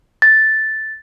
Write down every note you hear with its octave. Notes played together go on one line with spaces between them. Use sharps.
A6